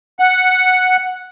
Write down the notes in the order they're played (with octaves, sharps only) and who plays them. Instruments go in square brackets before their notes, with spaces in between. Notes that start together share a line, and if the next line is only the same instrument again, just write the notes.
[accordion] F#5